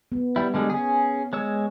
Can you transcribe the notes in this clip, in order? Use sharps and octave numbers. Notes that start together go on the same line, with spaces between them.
B3
G3 E4
D3 G3 G#3
C#4 G#4
G#3 C#5 E6